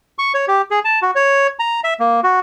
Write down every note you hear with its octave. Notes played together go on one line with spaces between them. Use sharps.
C#6
C#5
G4
G#4
A5
F#4
C#5
A#5
E5
A#3
F#4